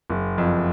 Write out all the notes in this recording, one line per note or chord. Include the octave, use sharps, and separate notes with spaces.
F#1
F2